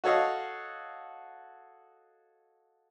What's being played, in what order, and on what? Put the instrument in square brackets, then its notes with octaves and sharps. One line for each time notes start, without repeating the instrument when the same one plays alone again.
[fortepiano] F#4 A4 C#5 D#5 F5